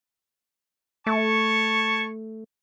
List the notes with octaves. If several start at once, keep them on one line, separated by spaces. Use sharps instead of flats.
A3 C#5 A5 C#6